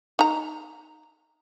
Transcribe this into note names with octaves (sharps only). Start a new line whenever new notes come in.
D#4 A#5